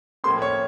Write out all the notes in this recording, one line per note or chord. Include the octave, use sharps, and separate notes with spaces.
A2 F3 A#3 C#4 C6
C#5